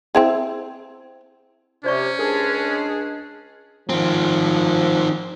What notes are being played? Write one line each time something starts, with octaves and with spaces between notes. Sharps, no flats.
C4 E4 G#4
C3 C#4 C5 D5 C#6
C#2 G#3 D4 G#4 A#4
D#3 F3 C4